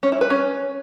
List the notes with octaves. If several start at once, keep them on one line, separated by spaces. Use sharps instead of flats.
C#4
E4
B4
C#4